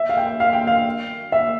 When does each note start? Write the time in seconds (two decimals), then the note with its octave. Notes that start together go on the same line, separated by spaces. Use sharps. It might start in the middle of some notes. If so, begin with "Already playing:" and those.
Already playing: E5
0.09 F5
0.17 G5
0.40 F5
0.53 G5
0.67 F5
1.32 E5